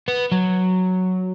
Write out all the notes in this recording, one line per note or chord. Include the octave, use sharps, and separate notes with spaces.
B3
F#3